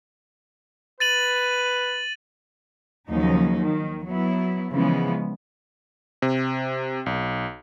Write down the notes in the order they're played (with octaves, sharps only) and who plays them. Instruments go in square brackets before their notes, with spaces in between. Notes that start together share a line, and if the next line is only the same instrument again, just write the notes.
[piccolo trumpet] B4 [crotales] A6 D#7 F#7
[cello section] D#2 C#3 F3 F#3 D#4
D#3
F#3 B3 E4
C#3 E3 F3 G#3 B3
[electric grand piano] C3
B1